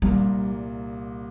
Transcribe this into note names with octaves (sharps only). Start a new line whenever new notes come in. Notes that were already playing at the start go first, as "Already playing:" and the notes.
C2 A#2 G3 A#3